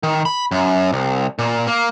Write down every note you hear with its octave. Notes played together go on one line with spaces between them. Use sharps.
D#3
B5
F#2
C2
A#2
A#3